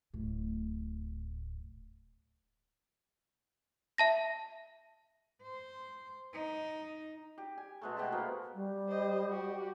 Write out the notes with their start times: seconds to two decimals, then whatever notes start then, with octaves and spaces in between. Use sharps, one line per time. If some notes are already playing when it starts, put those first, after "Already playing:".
0.14 D1 A2
3.98 E5 A5 A#6
5.43 C5
6.34 D#4
7.38 G4
7.58 G#5
7.82 B2 G#3 A3
7.96 B2 G4 E5 A5
8.12 A#3 B3 F#4 C5
8.55 G3
8.89 C5 D#5
9.30 F#4 G4